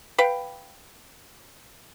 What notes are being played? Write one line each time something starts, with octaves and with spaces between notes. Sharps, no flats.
B4 F5 G5